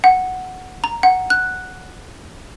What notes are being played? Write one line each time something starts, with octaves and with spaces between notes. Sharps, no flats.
F#5
A#5
F#5
F#6